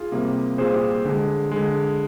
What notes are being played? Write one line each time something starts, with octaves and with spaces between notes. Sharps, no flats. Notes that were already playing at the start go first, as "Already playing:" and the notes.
Already playing: F4 G#4
C3 G3 A#3
A#2 G3 A#3 G#4 C5
G4
D3 G#3
D3 G#3